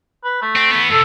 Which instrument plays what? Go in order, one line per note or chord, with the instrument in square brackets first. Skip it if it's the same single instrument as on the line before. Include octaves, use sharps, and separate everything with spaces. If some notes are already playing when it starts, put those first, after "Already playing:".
[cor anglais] B4
A3
[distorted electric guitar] C4
E3 B3
[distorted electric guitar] F#2 C3 [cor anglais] A4